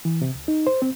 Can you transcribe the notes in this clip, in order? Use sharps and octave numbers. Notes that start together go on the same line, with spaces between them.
E3
C3
C#2
D#4
C5
C4